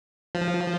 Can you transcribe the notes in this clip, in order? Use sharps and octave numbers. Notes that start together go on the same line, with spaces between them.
F3